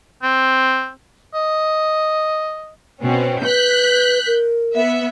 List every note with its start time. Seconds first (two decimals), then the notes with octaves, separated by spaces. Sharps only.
0.23 C4
1.34 D#5
3.01 B2 C4 C#4
3.44 B4 F#6 G6 B6
4.27 A#4
4.74 B3 E5